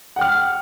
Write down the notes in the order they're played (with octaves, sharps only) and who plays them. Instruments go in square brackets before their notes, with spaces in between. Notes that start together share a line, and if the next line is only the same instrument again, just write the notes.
[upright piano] F#5
G5
F6